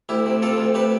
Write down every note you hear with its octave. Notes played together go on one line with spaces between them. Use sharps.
D2 E4 G4
C3
C3 F4 A4
D2
C3 G4 B4